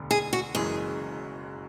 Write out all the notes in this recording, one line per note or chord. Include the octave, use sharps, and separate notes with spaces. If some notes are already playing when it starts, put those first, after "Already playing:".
Already playing: E1 D2 D3
G#4
F#4
F#1 F#2 E3 G#3 G#4